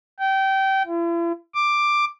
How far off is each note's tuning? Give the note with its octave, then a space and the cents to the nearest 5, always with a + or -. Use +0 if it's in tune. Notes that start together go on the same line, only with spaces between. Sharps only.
G5 -25
E4 +45
D6 +10